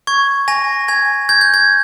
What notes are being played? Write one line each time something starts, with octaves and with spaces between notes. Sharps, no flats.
C#6 G#6
G#5 A#6
G#5 G#6
G6 G#6
G6
G#6